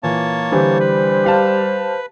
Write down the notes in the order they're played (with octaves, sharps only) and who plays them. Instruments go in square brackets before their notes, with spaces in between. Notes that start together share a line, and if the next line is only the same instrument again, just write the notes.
[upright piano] A#2 E3 [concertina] A#3 C#5 A5
[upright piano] D3 E3 G4 [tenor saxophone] G3 [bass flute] C5
[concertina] B4
[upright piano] G4 F5 A5